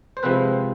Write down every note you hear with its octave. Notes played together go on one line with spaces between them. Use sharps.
C5
C3 F3 G#3 C4 B4